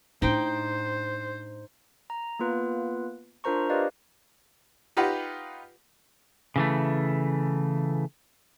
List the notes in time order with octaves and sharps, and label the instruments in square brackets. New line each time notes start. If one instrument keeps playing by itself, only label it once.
[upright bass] A2 D4 [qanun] D#4 G5 [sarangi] C5
[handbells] A#5
A#3 B3 F4 B4
D4 F4 A#4 C5 A#5 C#6
G4 B4 D5 D#5 F5
[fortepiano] D#4 F4 G4 B4 F#5
[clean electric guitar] C#3 E3 A3